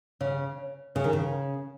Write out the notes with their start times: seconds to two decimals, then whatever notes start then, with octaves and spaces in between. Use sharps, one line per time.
0.21 C#3 C#5
0.58 C#5
0.95 C#3 C#5
1.04 D#3
1.13 C#3